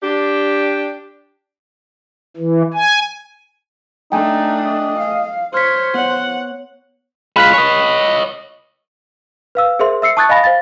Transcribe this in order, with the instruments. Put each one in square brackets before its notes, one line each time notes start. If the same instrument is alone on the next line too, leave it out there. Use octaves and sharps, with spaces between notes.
[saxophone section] D4 G4
[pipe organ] E3
G#5
[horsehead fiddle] A3 D4 [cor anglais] D#4 [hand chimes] G5 G#5
[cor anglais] D#5
[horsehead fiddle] F5
[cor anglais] C5 [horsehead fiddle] C#5 [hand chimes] F6 B6
[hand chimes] B3 C#5 [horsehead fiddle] F#5
[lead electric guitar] G#3 F4 [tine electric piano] B5 F#6 B6
[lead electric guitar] C#5 D#5
[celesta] B4 F5 E6
G#4 A#4 C5 E5 C6
E5 E6 C7 C#7
A5 C#6 D#6 F#6 G#6 A6
D#5 F5 G#5 B5 A#6
C5 F5 A6